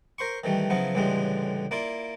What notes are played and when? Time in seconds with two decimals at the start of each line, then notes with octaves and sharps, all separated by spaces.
0.18 A#4 C5 C6 C#6
0.44 D#3 E3 G3 A3
0.70 C#3 F3 F#3 B3 E4
0.95 C#2 A2 D3 E3 G3 G#3
1.71 A#3 E4 F4 D5